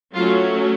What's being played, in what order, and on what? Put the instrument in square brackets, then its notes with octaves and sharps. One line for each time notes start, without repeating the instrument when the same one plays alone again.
[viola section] F#3 A3 C#4 F4